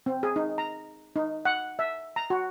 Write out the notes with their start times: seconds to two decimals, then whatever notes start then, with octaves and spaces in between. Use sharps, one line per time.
0.06 C4
0.23 G#4
0.36 D#4
0.58 A#5
1.16 D#4
1.45 F#5
1.79 E5
2.16 A#5
2.30 F#4